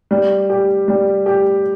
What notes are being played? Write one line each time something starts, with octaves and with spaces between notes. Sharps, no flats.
G3
G4
G3
G4